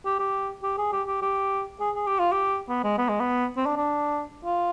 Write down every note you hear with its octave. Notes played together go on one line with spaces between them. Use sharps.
G4
G4
G4
G#4
G4
G4
G4
G#4
G#4
G4
F4
G4
B3
G#3
B3
G#3
B3
C4
D4
D4
F4